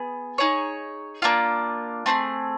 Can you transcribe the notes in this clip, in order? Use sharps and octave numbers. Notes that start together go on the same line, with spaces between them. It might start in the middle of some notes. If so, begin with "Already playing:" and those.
Already playing: B3 G#4
D#4 G#4 C#5
A#3 D4 F4
A3 C4 E4 G#4